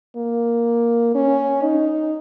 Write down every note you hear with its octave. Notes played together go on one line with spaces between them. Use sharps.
A#3
C#4
D#4